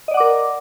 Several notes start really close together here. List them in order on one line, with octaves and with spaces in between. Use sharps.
D#5 D5 F#5 D6 A#4